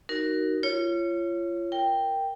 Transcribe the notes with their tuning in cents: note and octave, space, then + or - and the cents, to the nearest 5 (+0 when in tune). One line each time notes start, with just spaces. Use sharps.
D#4 +0 F#4 +20 A#4 +0
F4 -35 C#5 -5
A#4 +0 G5 +0